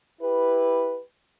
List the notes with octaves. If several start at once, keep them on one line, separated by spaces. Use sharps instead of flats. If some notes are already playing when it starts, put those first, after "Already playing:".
E4 G4 B4